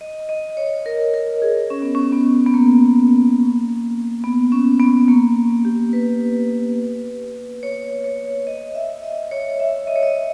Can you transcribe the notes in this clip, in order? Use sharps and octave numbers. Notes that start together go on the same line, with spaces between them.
D#5
D#5
C#5
A#4
A#4
G#4
C#4
B3
C#4
B3
B3
A#3
B3
C#4
B3
A#3
G4
B4
C#5
C#5
D#5
E5
D#5
C#5
E5
D#5
C#5
D#5